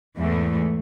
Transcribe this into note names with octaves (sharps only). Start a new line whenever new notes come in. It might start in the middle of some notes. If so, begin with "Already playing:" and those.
E2 G#2 E3 A3